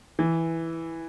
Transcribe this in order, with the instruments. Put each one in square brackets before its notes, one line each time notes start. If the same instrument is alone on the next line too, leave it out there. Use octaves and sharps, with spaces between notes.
[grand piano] E3